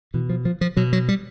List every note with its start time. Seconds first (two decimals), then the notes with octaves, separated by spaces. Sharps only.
0.14 B2 E3
0.30 F3
0.45 F3
0.61 F3
0.77 B2 F#3
0.93 F#3
1.08 G3